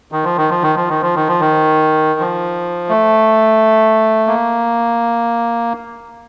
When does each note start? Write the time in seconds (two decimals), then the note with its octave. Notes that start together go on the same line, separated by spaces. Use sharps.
0.12 D#3
0.24 F3
0.37 D#3
0.50 F3
0.62 D#3
0.76 F3
0.89 D#3
1.02 F3
1.15 D#3
1.28 F3
1.40 D#3
2.20 F3
2.89 A3
4.27 A#3